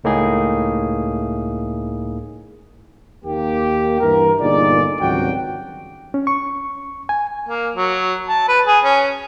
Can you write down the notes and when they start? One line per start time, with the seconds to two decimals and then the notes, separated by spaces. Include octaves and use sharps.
0.04 C#2 A2 A#3 D#4 G#4
3.24 D#2 A#3 G4
4.00 G2 E3 A#3 A#4
4.40 G1 A#2 D#4 G#4 D5
5.00 G#1 C#2 F#3 G3 F#4 G5
6.14 C#4
6.27 C#6
7.09 G#5
7.48 A#3
7.75 F#3
8.29 A5
8.48 B4
8.66 G#4
8.84 C#4